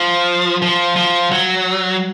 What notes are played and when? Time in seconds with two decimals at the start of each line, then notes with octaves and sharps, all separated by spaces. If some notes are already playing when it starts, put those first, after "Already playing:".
Already playing: F3
0.62 F3
0.96 F3
1.32 F#3